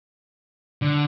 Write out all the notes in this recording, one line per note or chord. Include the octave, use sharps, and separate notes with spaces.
D3